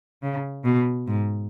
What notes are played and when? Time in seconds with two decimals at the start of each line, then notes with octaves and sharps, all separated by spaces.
0.23 C#3
0.65 B2
1.07 G#2